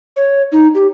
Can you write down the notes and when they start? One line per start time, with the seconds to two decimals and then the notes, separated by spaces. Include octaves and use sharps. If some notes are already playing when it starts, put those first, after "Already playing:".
0.16 C#5
0.52 D#4
0.75 G4